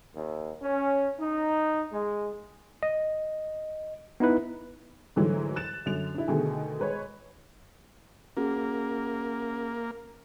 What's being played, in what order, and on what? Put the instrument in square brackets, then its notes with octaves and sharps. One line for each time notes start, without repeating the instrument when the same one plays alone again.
[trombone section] D#2
C#4
D#4
G#3
[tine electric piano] D#5
B3 D#4 E4 B4
[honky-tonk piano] G#2 D3 E3 F#3 A3
F#6 A6 E7
F#2 D3 F7
D4 E4
B2 D3 D#3 A3 G#4
G#3 B4 C#5
[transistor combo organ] A#3 [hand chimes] C#4 F#4 G#4